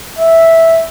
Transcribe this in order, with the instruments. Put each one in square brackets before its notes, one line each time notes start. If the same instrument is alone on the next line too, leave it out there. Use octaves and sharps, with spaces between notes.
[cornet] E5